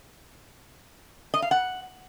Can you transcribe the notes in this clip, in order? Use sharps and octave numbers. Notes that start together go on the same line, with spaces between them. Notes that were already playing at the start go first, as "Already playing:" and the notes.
D#5
F5
F#5